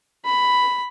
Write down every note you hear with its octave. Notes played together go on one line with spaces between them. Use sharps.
B5